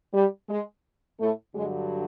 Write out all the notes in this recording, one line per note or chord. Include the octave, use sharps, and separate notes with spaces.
G3
G#3
A2 A3
G2 D3 F#3 G#3